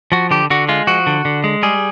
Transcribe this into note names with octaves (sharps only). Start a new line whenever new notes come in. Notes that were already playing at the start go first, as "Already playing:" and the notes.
F3 F#4
D3 G4
D3 F#4
G#3 F4
F3 F#4
D3
D3
G#3
G3 G#4